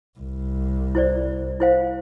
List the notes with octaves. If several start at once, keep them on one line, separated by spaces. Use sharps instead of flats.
C2
E4 C5 D5
E4 C5 F5